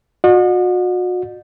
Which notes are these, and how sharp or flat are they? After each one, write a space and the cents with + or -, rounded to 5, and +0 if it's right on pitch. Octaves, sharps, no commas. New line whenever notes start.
F#4 -35 D#5 -45